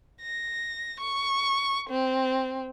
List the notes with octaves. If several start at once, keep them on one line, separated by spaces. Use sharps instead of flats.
A#6
C#6
C4